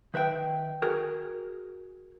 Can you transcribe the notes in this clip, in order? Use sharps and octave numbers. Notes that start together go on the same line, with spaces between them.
D#3 B4 E5 G5
F#4 G#4 A#4